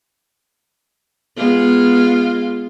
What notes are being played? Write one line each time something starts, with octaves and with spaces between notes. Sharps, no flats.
G#3 B3 F4